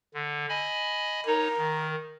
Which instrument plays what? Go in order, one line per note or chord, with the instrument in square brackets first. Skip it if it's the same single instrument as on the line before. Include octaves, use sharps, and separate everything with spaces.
[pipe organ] D3
D#5 G#5 B5
[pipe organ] D#4 C#5 [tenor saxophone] A#4
[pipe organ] D#3